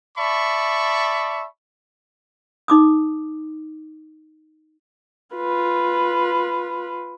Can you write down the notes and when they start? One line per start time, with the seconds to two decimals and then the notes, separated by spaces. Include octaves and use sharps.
0.18 D5 E5 A5 B5 C#6
2.68 D#4 D6 D#6
5.36 F4 B4